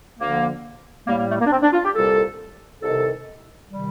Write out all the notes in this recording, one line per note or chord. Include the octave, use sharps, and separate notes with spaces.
D2 D3 F3 A#3
A2 G3 A#3
A#3
A3
A#3
D4
C4
D4
F4
G4
C2 A#2 G3 A4
C2 C3 D#3 A4
C3 D#3 G3